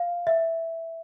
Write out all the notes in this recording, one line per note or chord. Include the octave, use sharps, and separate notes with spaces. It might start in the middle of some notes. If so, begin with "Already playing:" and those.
Already playing: F5
E5